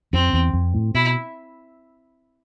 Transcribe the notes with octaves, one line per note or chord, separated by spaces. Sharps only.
F2 C4
E2
F2
A2
B2 E4